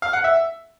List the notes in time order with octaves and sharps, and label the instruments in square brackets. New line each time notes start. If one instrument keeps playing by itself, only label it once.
[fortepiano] F5
F#5
E5